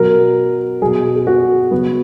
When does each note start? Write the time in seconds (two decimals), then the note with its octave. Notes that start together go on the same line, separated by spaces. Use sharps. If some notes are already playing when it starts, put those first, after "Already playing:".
Already playing: B2 F#3 A#4
0.82 B2 F#3 G#4
1.16 G#4
1.27 F#4
1.71 C#3 F#3 B3